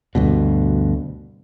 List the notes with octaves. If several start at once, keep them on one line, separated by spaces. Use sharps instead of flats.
D2 G2 B2